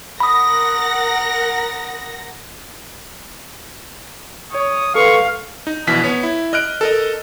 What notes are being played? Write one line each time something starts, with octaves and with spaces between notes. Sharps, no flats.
A#4 F#5 B5 D#6 A#6
C#5 D#6
A4 B4 F5 C6 C#6
D#4
A#1 B2 E3 B6
B3 C#5
E4
D#5 F6 F#6 D7
A4 A#4 D#5